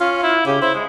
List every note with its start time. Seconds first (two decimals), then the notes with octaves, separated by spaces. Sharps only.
0.01 C#4 F4
0.23 E4
0.46 C#3 G4
0.61 E4 C5
0.75 G#3